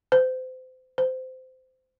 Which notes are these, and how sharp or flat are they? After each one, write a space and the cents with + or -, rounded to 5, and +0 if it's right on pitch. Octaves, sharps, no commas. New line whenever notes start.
C5 -30
C5 -20